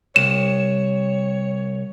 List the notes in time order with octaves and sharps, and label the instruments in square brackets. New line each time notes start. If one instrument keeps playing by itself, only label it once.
[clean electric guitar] C2 [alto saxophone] C#5 [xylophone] E7